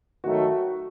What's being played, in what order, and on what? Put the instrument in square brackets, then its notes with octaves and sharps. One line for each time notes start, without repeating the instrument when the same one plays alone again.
[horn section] D#3 F#3 A3 [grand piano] F#4